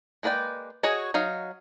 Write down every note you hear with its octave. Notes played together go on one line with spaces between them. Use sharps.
G#3 A#3 B4 D5 G5
F#4 G#4 C#5 D#5
F#3 D#4 F5